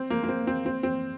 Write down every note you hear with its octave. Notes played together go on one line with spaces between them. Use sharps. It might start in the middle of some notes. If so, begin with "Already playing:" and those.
Already playing: C4
A#3
A#3
C4
C4
C4
C4